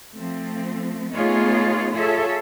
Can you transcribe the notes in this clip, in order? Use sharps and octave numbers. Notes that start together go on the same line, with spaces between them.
F3 A3 C4
A3 B3 D#4 F4 G#4 C#5
F4 G#4 A4 C#5 E5